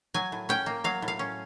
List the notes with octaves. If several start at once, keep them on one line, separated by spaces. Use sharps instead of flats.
F#3 G#5
A2
C#4 G5
A#3
F#3 F5
A2
F5
C#4